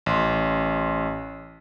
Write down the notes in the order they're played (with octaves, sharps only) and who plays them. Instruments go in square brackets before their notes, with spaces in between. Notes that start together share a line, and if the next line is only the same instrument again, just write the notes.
[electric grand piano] A1 C6